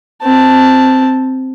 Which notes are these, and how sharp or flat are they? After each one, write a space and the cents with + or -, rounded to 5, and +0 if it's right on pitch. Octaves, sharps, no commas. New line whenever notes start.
C4 +0 A5 +0